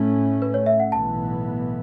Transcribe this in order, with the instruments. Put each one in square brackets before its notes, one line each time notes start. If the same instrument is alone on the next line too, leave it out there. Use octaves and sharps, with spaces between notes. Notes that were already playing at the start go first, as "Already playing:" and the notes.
Already playing: [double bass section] A2 A3 C#4
[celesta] B4
C#5
E5
F#5
[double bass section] B1 A2 E3 B3 [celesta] A5